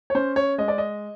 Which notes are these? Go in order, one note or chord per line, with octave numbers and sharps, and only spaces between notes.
C#5
C#4 C5
C#5
G#3 D#5
D5
D#5